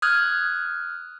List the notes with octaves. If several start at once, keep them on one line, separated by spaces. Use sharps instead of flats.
D#6 F6 F#6 G#6